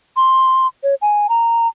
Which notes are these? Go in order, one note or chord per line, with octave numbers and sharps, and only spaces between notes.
C6
C#5
G#5
A#5